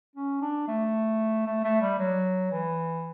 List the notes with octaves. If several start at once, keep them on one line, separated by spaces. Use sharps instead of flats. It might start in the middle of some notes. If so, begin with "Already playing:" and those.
C#4
D4
A3
A3
A3
G3
F#3
E3